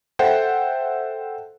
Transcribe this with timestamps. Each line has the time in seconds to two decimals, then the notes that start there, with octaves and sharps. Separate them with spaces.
0.19 A4 C5 E5 F#5 G5